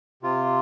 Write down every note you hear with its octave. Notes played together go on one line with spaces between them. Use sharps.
C3 F4